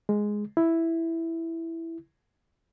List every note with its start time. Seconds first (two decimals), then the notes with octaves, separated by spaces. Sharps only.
0.09 G#3
0.57 E4